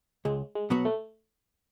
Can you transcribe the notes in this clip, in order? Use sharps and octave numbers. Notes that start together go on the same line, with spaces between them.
C#2 G#3
G#3
B2 F#3 B3 F#4
A3